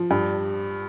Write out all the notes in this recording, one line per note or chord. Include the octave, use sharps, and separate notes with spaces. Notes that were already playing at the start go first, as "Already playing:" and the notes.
Already playing: F3
G2